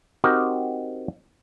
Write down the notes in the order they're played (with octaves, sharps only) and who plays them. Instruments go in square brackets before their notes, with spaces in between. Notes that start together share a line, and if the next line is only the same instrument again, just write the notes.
[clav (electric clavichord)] C4 D#4 F#4 G4 A#4